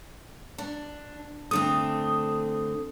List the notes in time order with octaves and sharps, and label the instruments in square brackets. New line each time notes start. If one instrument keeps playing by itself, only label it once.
[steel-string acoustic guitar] D4
[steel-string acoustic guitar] D3 A3 C4 [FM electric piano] D#6